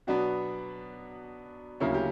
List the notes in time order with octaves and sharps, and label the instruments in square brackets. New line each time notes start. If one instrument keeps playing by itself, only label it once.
[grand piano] B2 F#3 B3 [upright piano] D4 F#4
[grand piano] D2 C#3 F#3 A#3 [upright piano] C#4 E4
[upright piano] G4